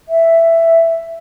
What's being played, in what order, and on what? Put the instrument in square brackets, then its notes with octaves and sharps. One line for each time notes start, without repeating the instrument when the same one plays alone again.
[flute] E5